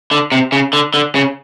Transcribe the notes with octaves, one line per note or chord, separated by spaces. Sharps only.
D3
C3
C#3
D3
D3
C#3